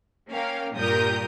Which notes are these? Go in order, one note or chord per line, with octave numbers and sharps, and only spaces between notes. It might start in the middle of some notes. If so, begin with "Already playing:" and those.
A#3 C#4 A#4 F5 G5
G2 A#2 G4 A#4 D#6 G6